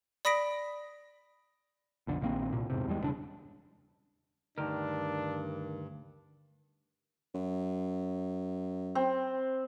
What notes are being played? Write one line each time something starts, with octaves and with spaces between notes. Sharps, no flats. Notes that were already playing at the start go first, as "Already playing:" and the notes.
D5 B5 D#6 A#6 B6 D7
B1 F2 D3
A#1 D#3 A#3 C4
C2 A#2
E2 G#2 C3
E2 G3 G#3
E1 E2 C#3 D4
D2 G2 D#3 D4 A#4
F#2
C4